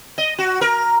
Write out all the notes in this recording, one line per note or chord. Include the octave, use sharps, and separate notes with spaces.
D#5
F#4
A#4